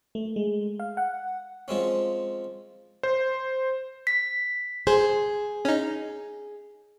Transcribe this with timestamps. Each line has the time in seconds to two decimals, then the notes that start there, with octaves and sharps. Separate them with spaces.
0.15 A3
0.36 G#3
0.80 F5
0.97 F#5
1.68 F3 G#3 C4 C#4
3.03 C5
4.07 B6
4.87 G#4 C5
5.65 C#4 D#4